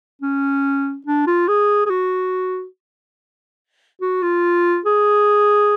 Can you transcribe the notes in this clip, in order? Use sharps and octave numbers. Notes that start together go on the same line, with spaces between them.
C#4
D4
F4
G#4
G#4
F#4
F#4
F4
G#4